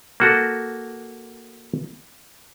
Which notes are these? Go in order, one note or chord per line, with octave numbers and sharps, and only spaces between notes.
A#3 F#4 A4